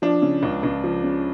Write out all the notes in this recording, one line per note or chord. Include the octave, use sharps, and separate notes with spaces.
F3 D4
C#3
C#2
C#2
F3
C#3